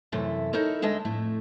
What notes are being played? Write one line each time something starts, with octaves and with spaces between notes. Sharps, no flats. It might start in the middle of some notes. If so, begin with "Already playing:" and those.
F#2 C3 E3 A3 E4 E5
D#4 E4 A4 A#4 C#5
D2 G#3 D4 D#5 E5
F2 A2 A3 E4